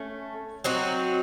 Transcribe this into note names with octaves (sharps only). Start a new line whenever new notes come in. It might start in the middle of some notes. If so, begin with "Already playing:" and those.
Already playing: A3 C#4
F#3 C4 D#4 F#4